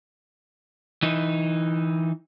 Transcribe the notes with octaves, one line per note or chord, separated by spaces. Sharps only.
E3 D#4